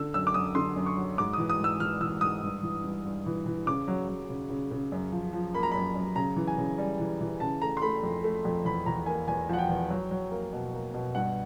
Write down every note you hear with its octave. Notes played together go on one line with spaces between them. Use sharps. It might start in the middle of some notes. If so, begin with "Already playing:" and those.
Already playing: D3 E6
F#2 E6
D6
F#2 D#6
D3 C6
F#2
C#6
F#3
G#2 D6
E3 D#6
D#6
G#2 E6
E3 F6
E3 E6
G#2 D#6
G2
E3
G2
G2
E3
E3
C#3 D6
F#3
F#3
C#3
C#3
C#3
F#2
F3
F3
A#3 B5
A#5
F#2 B5
F#2
C#3 A#5
E3
G#5
C#3
G3
E3
E3
C#3 A5
A3 A#5
C6
A3 B5
F2
A3
F2
E2 B5
E2 A#5
A#3 G#5
E2 G#5
F3 F#5
G5
E2
F#3
F#3
A#3
B2
A#3
B2
G2 F#5